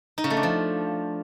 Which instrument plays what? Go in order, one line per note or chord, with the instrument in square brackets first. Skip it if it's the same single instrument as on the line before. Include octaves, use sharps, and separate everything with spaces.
[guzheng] D#4
C#3
A3
D4
F3